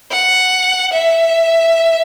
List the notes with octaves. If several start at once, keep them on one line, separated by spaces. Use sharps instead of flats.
F#5
E5